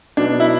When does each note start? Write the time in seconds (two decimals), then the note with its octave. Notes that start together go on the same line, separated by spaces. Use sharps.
0.17 B2 F#3 B3 D4
0.40 E4